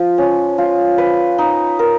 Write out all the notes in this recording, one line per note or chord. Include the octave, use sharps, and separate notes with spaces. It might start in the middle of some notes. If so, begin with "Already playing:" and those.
Already playing: F3
C#4
F4
B4
D#4
A#4